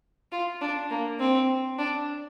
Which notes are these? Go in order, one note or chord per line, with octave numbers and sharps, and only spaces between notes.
F4
D4
A#3
C4
D4